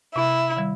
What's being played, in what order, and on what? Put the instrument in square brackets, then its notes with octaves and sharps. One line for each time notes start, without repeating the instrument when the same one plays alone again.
[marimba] C3 [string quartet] E4
[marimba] D#3 G3